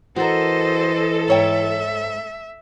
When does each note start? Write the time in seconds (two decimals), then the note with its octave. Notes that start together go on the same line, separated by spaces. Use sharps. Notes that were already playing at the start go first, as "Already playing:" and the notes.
0.16 E3 F#4 A4 A#4 C5 D#5
1.28 G#2 C#5 E5 G5